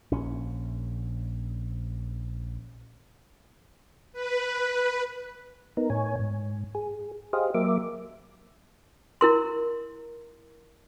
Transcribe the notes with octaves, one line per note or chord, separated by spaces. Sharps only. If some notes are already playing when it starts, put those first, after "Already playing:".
A#1 C#4
B4
B3 D#4 A#4
A2 C#5 G#5
G#2
G#4
G4 G#4 C5 D#5 F5
F#3 A#3 A#4 E5 D6
E4 A#4 C6